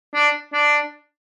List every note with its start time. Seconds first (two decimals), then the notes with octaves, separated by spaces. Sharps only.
0.14 D4
0.53 D4